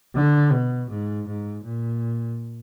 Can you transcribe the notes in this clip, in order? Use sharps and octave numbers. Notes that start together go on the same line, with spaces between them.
D3
B2
G#2
G#2
A#2